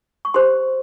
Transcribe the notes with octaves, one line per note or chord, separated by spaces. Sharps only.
C#6
G4 C5 C6